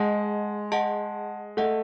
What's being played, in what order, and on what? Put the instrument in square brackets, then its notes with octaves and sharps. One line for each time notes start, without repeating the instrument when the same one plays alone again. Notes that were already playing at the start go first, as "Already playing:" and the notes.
Already playing: [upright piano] G#3 [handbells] G#4 D#5 F#5 A5
[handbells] G#4 D#5 F#5 A5
[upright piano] A3 [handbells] G#4 D#5 F#5 A5